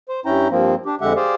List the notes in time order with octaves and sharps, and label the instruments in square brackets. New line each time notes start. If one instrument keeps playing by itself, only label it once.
[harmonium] C5
G2 C#4 E4 G5 A#5
G2 F3 A#3 C4
D4 G4
F2 D3 G#3 G4 E5 F#5
G4 G#4 C5 D5 F5